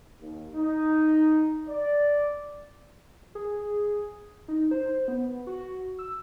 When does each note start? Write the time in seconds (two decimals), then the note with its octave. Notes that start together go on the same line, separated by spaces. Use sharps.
0.20 D#2
0.56 D#4
1.69 D5
3.35 G#4
4.48 D#4
4.71 C5
5.08 B3
5.47 F#4
5.99 E6